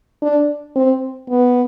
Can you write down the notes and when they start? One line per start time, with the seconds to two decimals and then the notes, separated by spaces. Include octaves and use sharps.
0.22 D4
0.76 C4
1.30 B3